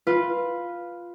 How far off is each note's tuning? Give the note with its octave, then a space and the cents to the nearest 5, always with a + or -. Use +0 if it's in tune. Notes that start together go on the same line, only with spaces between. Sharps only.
F4 +0 B4 -5